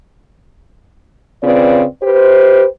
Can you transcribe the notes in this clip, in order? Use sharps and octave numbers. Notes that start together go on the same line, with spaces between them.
C#3 C4 F4 B4 D5
G4 B4 C5